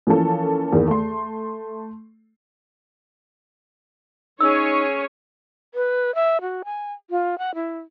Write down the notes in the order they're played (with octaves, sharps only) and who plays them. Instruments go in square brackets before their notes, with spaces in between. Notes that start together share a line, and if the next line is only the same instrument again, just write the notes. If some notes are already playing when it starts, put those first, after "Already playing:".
[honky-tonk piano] E3 F3 A#3 C#4 A4
E2 D#3 A#3
A3 C6
[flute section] C#4 G#4 [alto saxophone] D#4 [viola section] C#5 [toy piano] E6
[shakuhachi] B4
E5
F#4
G#5
F4
F#5
E4